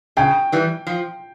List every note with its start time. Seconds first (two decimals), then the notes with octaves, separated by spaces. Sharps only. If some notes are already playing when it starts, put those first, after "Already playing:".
0.17 C#3 G5
0.52 E3 G3
0.87 F3